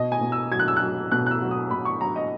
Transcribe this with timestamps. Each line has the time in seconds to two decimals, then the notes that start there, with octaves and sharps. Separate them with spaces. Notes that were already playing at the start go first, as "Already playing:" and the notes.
Already playing: B2 D#5
0.12 G#5
0.21 B2
0.32 E6
0.51 F#3 G#6
0.59 F#6
0.68 E6
0.76 F#6
0.82 F#3
1.12 B2 F#6
1.26 F#6
1.31 E6
1.41 F#3
1.51 D#6
1.71 B2 B5
1.85 C#6
2.00 F#3 A#5
2.16 D#5